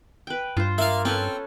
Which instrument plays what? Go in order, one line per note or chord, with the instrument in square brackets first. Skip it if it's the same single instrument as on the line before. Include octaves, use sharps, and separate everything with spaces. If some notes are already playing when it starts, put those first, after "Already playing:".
[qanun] B4 G5
[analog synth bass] G2 [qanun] F4 C5
[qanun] A#3 F4 [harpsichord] E5 F5
[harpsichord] C4 [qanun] C#4 A4 B4